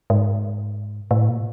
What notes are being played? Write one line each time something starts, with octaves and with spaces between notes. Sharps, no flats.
G#2
A2
A#2